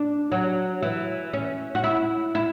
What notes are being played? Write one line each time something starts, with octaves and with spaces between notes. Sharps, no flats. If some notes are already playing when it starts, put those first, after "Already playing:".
Already playing: D4
F#3
E3
C#4
F#4
E4
E4